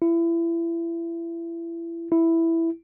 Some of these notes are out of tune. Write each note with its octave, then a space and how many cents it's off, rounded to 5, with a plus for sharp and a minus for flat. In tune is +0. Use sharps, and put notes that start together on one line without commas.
E4 +30
E4 +5